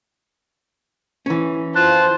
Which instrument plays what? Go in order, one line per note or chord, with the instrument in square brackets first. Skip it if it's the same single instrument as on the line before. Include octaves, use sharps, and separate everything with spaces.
[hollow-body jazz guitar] E3 C#4
[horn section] F4 A5 [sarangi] C5 [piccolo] F#6